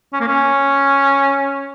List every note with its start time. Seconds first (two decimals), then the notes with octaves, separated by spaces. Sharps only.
0.13 C#4
0.20 A#3
0.28 C#4